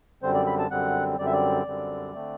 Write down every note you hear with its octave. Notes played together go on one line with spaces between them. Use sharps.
F#2 D3 G3 C4 C5
D5
B5
A5
F#2 D3 G3 C4 F#5
F#2 D3 G3 C4 D5
E5
D5
F#2 D3 G3 C4
D3 A3 C4